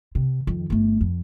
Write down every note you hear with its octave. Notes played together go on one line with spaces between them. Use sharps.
C3
F2 D#3
G1 A3
F2